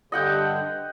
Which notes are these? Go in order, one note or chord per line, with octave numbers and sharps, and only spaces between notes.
G2 D3 D#5 F#5 G5